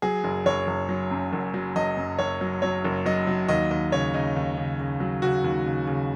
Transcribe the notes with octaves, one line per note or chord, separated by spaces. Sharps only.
F#3 G#4
F#1
F#1 C#5
F#1
F#3
F#2
F#1
F#3
F#1 D#5
F#2
F#1 C#5
F#3
F#3 C#5
F#1
F#3 D#5
F#3
D#2 D#5
D#2 D#5
C#3 C#5
C#3 D#4
D#2
C#3
C#3
F#3
C#3 F#4
D#2
C#3
C#3